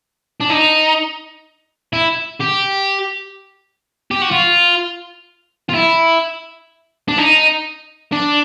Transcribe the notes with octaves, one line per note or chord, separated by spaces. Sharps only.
D4
D#4
E4
G4
G4
F#4
F4
F4
E4
D4
D#4
D4